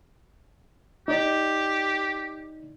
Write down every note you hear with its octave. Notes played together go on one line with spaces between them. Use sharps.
D#4 G4 D5